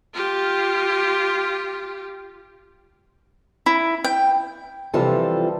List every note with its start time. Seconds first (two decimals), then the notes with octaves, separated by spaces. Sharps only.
0.14 F4 G4
3.66 E4
4.04 G5
4.94 C3 E3 F3 G3 F4 A4